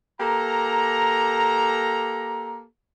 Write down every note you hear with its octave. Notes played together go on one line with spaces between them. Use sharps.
A#3 G4 A4 A#5